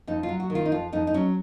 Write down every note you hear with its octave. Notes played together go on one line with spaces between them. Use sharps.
F2 D#4
F4
F#3
F#4
D#3
F4
D#4
F2 F4
F2 D#4
D#4
F#3 C#4